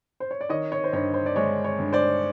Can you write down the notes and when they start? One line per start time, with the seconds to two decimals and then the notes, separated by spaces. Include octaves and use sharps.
0.20 C5
0.31 C#5
0.41 D5
0.49 D#3 C#5 D#5
0.72 C#5
0.84 C5
0.93 G2 C#5
1.14 C5
1.26 D5
1.36 G#3 C#5
1.64 C#5
1.79 G2
1.93 C5 D5